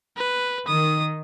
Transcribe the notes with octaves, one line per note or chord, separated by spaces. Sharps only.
B4
D#3 D#6